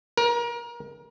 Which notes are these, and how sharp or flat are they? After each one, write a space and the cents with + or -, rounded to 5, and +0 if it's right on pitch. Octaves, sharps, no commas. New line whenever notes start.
A#4 +30